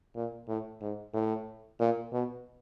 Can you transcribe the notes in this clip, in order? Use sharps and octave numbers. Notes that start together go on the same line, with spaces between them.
A#2
A2
G#2
A2
A#2
B2